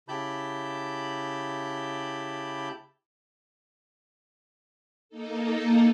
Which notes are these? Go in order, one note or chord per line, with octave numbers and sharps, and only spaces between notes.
C#3 E4 G4 A5 B5 G6
A#3 D#4 A4